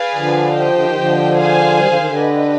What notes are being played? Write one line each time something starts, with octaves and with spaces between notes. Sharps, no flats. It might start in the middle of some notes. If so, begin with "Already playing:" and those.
Already playing: G#4 B4 D5 F5 G#5
D3 F3
G4 C5 D#5 G5
D3
D#3
D3 F3
G#4 C5 F5 G#5
D#3 G3
D3 F3
D#3
D3
G4 B4 D#5